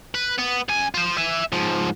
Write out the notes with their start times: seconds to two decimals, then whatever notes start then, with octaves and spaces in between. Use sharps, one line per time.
0.15 B4
0.38 B3
0.69 F#2 G#5
0.94 F4 C5
1.18 E5 G#5
1.52 G#2 F3